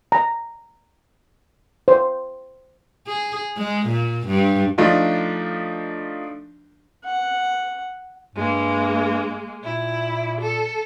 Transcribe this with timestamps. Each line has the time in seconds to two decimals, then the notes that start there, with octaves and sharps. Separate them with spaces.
0.12 A#5
1.88 C5
3.07 G#4
3.57 G#3
3.87 A#2
4.27 G2
4.78 F3 A3 D4 D#4 F4
7.04 F#5
8.35 G2 G#3 A#3
9.64 A#2 E4
10.41 A4